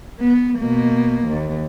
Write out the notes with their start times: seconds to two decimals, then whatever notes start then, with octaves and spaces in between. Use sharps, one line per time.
0.20 B3
0.59 B2 A#3
1.28 D#2